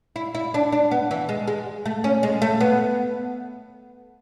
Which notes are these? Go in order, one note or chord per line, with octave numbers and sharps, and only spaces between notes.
E4
E4
D4
D4
B3
E3
G#3
G#3
A3
C#4
G#3
A3
B3